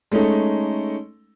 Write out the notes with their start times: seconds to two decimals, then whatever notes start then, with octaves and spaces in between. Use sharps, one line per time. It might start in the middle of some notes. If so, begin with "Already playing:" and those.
0.12 G#3 A3 C#4 D#4 A4